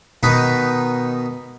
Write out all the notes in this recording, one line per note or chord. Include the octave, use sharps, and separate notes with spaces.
B2 D#3 B3 D#4 B4 B5